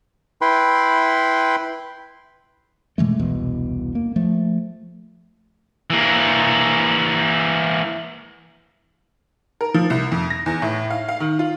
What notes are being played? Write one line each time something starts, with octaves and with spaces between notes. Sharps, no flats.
E4 B4 G5 B5 C6
B2 E3 G#3 A3
E1 C2 B2 E3
A#3
F3 A3
E3 A#3
A#4
F3
C2
F2
A#6
E2
A2
F5
F5
D#3
F4